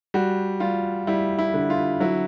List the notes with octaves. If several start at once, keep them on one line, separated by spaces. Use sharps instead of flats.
G3 F#4
G3 F4
G3 E4
E4
D3
F4
F#3 E4